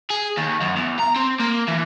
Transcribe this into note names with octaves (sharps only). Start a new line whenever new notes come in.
G#4
D#2
F#2
E2
A#5
C4
A#3
E3